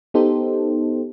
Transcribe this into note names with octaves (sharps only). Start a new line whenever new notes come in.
B3 D#4 G4 A4 C5